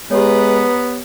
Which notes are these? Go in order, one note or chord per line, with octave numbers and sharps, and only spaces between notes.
G#3 B3 G4 B4 C#5 A#5